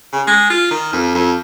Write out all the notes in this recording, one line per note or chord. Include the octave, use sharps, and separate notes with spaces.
C#3
G#3
F4
D#3
F2
F2